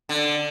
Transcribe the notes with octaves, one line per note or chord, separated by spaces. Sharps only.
D3